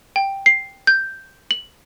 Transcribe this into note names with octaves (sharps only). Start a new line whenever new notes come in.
G5
C7
G6
F#7